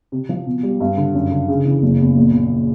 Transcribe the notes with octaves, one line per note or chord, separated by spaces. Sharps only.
C3
F3
B2
G3
G2
D3
F#2
D3
C#3
E3
F#1
E2
A#1
A#2